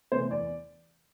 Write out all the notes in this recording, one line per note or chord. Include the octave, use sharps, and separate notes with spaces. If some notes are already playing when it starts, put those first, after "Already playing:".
C3 E3 A3 C5
E2 D5